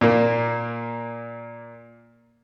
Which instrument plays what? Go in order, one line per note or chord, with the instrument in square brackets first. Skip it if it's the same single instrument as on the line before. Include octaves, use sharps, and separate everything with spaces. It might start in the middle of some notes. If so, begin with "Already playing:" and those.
[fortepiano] A#2 A#3